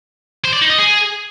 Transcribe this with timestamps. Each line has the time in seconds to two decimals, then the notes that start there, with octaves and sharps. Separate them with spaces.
0.45 C5
0.53 D5
0.62 D#4
0.70 D#5
0.78 G#4